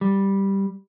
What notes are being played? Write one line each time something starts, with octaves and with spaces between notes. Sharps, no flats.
G3